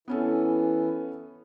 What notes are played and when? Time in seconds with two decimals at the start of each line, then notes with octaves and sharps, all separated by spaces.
0.08 E3 B3 C#4 A4